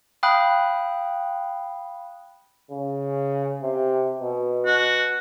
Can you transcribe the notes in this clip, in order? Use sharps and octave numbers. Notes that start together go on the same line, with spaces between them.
F5 G5 B5 D#6 F#6
C#3
C3
B2
F#4